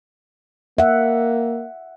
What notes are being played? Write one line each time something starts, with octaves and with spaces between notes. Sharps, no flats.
A#3 E5 F#5